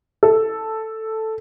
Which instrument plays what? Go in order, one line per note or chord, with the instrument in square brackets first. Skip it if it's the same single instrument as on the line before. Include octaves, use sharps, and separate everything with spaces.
[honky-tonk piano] A4